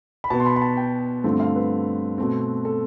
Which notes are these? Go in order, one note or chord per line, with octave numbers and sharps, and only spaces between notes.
B5
B2 B3 A5
C6
B5
B5
A5
G5
G2 D3 F3 A3 C4
F5
B4
B2 A3 C4
A4